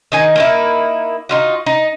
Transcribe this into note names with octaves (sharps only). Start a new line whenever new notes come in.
D#3 D#4 G#5
A#3 D#4 E4
D#4 F4 F#4
D#4